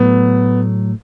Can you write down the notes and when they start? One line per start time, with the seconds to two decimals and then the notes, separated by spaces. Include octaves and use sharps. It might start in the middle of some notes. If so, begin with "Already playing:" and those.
Already playing: A2 F#3 A3 B3